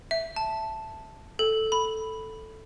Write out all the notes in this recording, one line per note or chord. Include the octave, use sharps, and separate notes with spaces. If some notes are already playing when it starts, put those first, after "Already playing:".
E5
A5
A4
B5